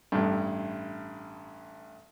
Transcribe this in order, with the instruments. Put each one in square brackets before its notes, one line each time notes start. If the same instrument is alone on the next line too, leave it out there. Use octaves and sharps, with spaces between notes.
[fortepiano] A1 G2